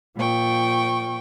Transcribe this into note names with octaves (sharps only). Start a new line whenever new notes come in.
A#2 F3 G5 C#6